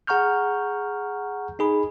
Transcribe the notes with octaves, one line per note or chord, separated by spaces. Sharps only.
G#4 F#5 A#5 C#6 F6 G6
D#4 G#4 B5